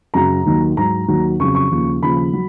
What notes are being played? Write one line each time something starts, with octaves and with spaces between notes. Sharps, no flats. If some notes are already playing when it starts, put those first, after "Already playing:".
F#2 C#3 F#3 A#5
D#2 D#3 F#3
G#2 F#3 A#5
D#2 D#3 F#3
F2 C#3 F#3 C#6
C#6
D#2 C#3 F3
D#2 C#3 F3 B5
F#3